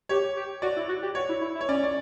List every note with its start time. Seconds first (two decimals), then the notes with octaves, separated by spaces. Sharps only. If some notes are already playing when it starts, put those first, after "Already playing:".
0.09 G4 C#5
0.36 G4
0.62 F#4 D5
0.76 E4
0.89 F#4
1.03 G4
1.15 F#4 C#5
1.29 E4
1.41 E4
1.55 E4
1.61 C#5
1.68 C#4 D5
1.84 D5